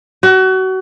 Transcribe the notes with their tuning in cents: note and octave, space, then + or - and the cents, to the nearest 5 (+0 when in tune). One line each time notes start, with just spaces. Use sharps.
F#4 +30